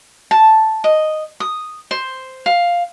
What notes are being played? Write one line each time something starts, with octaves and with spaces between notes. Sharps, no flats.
A5
D#5
D#6
C5
F5